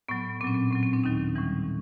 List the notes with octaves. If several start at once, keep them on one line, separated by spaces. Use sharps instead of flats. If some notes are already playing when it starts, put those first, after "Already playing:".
A2 F#3 B3
A#2 F#3 C4 C#4
C4
A2 F#3 C4
C4
C4 D4
D#2 D#3 F#3 C#4 D#4
A2 E3 G3